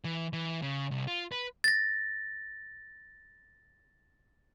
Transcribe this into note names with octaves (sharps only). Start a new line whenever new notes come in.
E3
E3
C#3
C2
F4
B4
A6 A#6